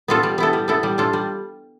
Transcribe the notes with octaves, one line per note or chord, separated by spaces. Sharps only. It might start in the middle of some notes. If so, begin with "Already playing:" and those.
B3 F4 A4
G3
B3 E4 A4
G3
B3 E4 A4
G3
D4 F4 A4
G3